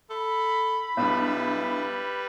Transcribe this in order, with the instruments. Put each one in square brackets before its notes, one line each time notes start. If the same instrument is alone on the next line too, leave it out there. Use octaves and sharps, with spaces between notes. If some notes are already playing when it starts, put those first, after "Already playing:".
[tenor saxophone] A4 [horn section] B5
[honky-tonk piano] B1 G2 [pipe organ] G3 B4 [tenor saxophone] E4